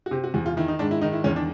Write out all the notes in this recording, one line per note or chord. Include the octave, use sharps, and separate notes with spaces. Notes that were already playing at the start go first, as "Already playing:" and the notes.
F#4
C3 G4
F#4
E2 F#4
F4
D#3 E4
D#4
G#2 D4
E4
D#3 D#4
E4
E2 C#4
D4